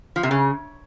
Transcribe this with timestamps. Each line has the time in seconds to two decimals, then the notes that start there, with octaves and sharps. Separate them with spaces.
0.16 F3
0.23 C3
0.31 C#3